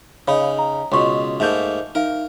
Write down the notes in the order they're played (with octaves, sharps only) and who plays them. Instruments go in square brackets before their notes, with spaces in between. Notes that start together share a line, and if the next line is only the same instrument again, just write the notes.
[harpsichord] C#3 D#4 [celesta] C#5 F5 B5
[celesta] A#5
[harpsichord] C#2 B2 [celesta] C#5 C6 C#6
[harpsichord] G#2 A3 A#3 [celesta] E5 G6
[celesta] D#4 E5 F5 [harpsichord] A#4